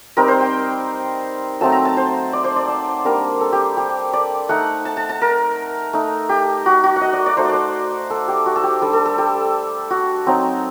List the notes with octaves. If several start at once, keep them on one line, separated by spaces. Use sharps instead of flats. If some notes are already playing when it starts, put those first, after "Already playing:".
G3 C4 D#4 A#4
C5
G5
F#3 A3 C4 D#4 A5
A#5
A5
C5
D5
C5
D5
A5
G3 A#3 D4 A#4
A4
G4
G4
D5
A3 D#4 F#5
A5
A5
A5
A#4
A3 D#4
G4
F#4
F#4
F#5
D#5
D5
D5
A3 D#4 C5
D5
C5
A4
G4
F#4
A4
G4
G3 D4 A4
A4
A4
G4
F#4
F#3 C4 D#4